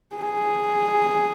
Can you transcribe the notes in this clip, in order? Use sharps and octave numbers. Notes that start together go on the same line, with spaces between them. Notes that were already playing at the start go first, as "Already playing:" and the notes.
G#4